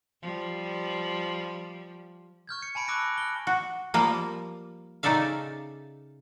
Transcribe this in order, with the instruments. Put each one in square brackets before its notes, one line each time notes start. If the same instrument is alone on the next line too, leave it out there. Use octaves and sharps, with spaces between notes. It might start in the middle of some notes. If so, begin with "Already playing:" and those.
[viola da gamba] F3 G3
[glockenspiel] C#6 F6 G6 G#6
C#7
G#5 A5 B5 D7
C#6 D6 E6 F#6 A#6 D7
D6
F6 G7
[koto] F#4
F3 G3 A#3
C#3 D#4 A4 D5 E5 F5